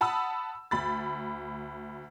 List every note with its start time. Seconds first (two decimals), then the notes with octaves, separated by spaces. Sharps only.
0.01 F#5 A5 B5 D#6 E6
0.71 D2 B5 A6